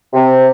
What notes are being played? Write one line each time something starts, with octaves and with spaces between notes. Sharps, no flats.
C3